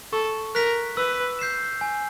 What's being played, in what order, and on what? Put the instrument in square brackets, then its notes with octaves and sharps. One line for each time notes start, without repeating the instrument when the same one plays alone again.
[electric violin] A4 [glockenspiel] C#6
[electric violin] A#4 [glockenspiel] F#6 B6
[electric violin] B4 [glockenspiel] E6
[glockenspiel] G6 C7 E7
G#5